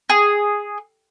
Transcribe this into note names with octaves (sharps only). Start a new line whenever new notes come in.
G#4